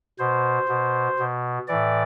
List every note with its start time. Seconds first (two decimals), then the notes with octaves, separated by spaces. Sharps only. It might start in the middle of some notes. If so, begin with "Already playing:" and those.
0.19 B2 C5
0.69 B2
1.19 B2
1.68 A2 E3 D5